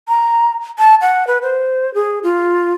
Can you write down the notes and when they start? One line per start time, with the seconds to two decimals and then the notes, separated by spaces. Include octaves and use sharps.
0.08 A#5
0.79 A5
1.01 F#5
1.27 B4
1.42 C5
1.94 G#4
2.23 F4